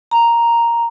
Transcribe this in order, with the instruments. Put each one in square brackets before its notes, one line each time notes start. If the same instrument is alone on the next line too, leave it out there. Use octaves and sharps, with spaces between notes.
[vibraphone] A#5